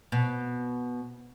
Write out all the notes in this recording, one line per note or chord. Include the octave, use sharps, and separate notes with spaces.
B2